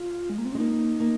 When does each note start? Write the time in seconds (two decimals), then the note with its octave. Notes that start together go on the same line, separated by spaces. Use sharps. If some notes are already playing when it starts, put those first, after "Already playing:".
Already playing: F4
0.30 G#3
0.38 A#3
0.45 C4
0.52 C#4
0.55 G#3
0.59 A#3 D#4
1.00 A#3